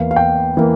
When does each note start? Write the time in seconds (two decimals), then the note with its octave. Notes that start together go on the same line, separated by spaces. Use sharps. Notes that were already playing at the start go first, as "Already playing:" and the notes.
Already playing: E2 E3 A#3 F5
0.11 F5
0.16 G5
0.57 E3 A#3